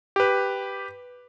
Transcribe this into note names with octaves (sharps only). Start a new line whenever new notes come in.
G4 B4